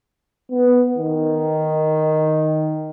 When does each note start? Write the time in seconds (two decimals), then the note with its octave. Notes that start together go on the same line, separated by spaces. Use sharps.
0.51 B3
0.98 D#3